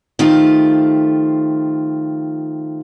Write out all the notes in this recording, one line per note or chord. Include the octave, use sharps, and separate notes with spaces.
D#3 F3 A3 F4 G4